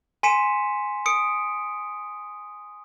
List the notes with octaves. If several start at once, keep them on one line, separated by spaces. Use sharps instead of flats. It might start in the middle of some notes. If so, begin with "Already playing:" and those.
G#5 C6 B6 C#7 D#7 E7
D#6 C#7 D7